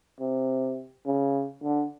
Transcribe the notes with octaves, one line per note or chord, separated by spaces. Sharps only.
C3
C#3
D3